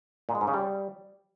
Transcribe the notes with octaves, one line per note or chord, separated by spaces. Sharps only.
A#2
G#3
G#2
C#3
G3